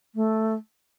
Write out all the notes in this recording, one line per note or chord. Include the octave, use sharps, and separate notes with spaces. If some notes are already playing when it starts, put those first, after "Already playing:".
A3